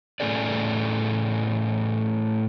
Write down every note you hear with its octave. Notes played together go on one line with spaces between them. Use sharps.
A2 A3 C#4 G#4 A4 D5